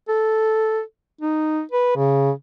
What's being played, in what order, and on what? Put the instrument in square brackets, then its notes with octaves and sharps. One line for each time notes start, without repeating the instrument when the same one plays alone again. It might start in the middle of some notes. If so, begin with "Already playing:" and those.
[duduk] A4
D#4
B4
C#3